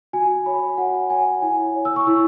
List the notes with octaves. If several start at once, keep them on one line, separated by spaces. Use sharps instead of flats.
F#4 G#5
C#5 B5
F#4 F#5
C#5 G#5
E4 G#5
C#5
E6
C#6
E4 E6